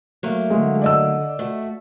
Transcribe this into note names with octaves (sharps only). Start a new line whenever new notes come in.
F#3 A3 A#3
D3 G#3
D5 D#5 E6
A3 F#4